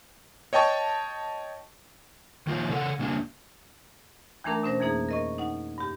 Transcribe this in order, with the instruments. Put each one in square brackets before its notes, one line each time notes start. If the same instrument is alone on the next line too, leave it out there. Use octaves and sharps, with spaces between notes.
[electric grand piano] C#5 D#5 G5 A5 C#6
[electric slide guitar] D#3 F3 A#3 F4
C#3 A4 F#5
C#3 A#3 D4
[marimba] D#2 E3 A3 D4 A#4 A#5
B2 C#4 C5 A#6
F2 E3 A#3 D#4 G#4
A#4 D#5 C#6
D#4 F#5
G2 G4